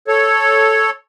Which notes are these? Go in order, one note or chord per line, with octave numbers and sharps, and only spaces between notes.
A4 C#5